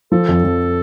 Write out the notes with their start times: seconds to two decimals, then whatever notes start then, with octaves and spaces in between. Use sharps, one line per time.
0.12 F3 A4
0.28 F2
0.44 F2